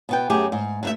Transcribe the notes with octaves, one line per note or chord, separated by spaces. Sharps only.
B2 B3 G5
F#2 A3 G4 G#4
G#2
G2 A3 E5